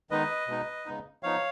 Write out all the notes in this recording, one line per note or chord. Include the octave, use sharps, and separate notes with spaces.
D#3 G#3 B3 D#4 B4 D#5
B2 G#3 B3 D#4
C#3 G#3 B3 D#4
F3 B3 D#4 C#5 F5